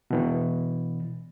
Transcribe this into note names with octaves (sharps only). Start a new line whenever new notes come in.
B2 E3